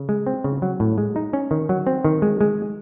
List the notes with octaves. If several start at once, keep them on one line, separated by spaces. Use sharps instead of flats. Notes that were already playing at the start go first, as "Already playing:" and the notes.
Already playing: C#3
G#3
C4
C#3
F#3
A2
G#3
D#4
C#4
D#3
F#3
C4
D#3
G#3
G#3